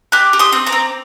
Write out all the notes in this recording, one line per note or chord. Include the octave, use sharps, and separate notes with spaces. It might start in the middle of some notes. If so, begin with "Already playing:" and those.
G4 D6 F#6
G4
C6 D#6
C4
A#5 D6
C4